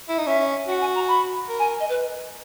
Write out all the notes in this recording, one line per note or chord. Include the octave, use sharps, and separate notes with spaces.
E4
D#4
C#4 E5
F#4 F#5
G#5
A#5
B5
A#4
G#5
D#5
B4